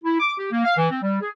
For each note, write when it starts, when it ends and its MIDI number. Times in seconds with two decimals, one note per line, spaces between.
0.03 0.18 64
0.19 0.33 86
0.38 0.51 67
0.52 0.64 58
0.64 0.75 77
0.77 0.88 52
0.89 1.00 60
1.02 1.19 55
1.20 1.29 68